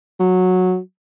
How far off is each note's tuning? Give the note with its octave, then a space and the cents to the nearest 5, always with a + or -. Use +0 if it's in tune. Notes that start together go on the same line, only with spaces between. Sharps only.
F#3 -10